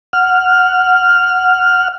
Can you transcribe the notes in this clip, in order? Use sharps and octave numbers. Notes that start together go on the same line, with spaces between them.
F#5 F6